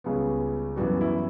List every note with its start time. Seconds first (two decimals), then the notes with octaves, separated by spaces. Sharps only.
0.04 C#2 C#3 G3 B3
0.76 F#2 E3 G3 B3 F#4
1.01 E4